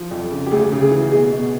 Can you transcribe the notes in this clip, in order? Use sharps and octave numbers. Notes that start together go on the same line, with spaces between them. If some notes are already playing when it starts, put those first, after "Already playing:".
Already playing: F3
F2
C#3
G4
D2 G#4
C#3
G#4
E3
B2 G#4
B2